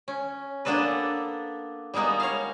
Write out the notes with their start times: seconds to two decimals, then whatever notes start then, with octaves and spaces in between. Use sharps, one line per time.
0.08 C#4
0.65 A#3 B3 D4 A4 B4
1.94 G3 G#3 A#3 B3 D#4
2.20 C#5 F5